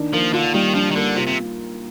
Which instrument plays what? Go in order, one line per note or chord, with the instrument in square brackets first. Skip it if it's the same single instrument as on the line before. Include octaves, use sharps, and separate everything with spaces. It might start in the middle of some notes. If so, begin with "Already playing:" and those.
Already playing: [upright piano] D#3 D4
[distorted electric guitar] F3 [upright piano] A#3
[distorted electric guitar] D3 [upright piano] F4
[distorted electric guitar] D#3 [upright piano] G3
[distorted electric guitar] F3 [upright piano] D4
[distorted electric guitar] D#3
[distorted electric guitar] D3 [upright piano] A#3
[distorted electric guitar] C3 [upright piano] F4
[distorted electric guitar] C3